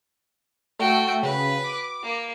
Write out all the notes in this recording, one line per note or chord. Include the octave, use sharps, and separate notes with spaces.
A3 F#4 G5
C#3 B4
D6
A#3